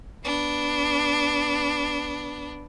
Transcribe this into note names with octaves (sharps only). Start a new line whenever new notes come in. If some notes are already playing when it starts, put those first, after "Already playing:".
B3 D4